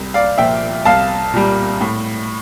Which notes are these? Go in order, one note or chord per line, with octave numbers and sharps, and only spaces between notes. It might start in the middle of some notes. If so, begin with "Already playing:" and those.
Already playing: C2
D5 F5
A#2 F3 E5 G5
C2 F5 A5
A#2 G3
A2